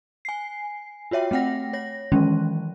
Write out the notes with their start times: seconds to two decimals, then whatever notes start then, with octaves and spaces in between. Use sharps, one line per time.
0.25 G#5 C7
1.11 F4 F#4 C#5 E5 G5
1.31 A3 C4 F#5 G5 A#6
1.73 C#5 A#6
2.12 D#3 E3 F#3 G#3 C#4